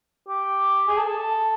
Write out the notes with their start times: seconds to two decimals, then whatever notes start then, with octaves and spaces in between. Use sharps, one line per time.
0.28 G4
0.87 G#4
0.97 A4
1.07 A4